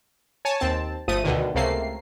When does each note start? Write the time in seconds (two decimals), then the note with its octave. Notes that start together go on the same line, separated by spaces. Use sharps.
0.45 C#5 G#5 A5
0.60 D#2 C4 A5
1.08 G1 F3 A3 D#6 D#7
1.24 D2 B2 D3 D#3
1.55 C#2 C3 A3 A#3 C7